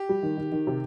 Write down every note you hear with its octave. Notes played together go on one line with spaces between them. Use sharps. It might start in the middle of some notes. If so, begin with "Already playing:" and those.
Already playing: G4
G3
D#3
D#3
D#3
C3